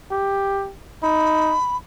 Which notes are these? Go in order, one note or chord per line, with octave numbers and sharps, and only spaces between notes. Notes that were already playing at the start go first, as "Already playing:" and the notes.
G4
D#4 B5